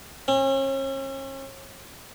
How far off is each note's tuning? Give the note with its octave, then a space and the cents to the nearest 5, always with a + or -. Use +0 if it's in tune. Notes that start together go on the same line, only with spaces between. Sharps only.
C#4 -40